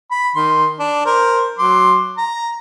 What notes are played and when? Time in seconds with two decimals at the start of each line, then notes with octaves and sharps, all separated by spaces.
0.11 B5
0.36 D#3 C6
0.80 D4
1.05 A#4 C5
1.58 F#3 C6 D6
2.17 A#5